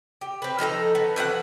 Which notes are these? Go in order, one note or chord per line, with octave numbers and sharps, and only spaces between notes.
G4
C4 B4
F3 D#4 A4 A#5
B3
E3 F3 C#5 F#5